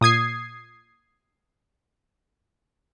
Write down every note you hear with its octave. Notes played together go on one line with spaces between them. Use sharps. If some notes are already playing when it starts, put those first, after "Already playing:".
A#2 D#6 G#6 C7